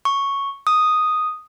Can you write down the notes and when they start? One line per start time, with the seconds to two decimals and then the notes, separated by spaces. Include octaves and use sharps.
0.05 C#6
0.67 D#6